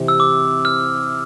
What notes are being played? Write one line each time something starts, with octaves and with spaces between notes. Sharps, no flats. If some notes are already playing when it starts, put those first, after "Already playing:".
Already playing: C3 E3
E6
D6
F6